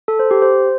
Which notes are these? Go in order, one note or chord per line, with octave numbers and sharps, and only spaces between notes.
A4
C5
G4
C5